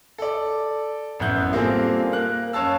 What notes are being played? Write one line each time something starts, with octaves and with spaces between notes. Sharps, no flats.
A4 D5
A1 F#2 B3 E4 F#6 G6
G3 A#3 C4 F4 G#4 A4
A#3 A#4 F#6
F#2 C#5 F5 A5 E6